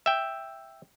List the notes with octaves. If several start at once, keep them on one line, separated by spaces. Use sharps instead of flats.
E5 G5